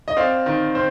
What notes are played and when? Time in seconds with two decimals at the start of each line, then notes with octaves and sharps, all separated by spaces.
0.08 D#5
0.17 C4 D5 F5
0.46 D#3
0.75 C4 C5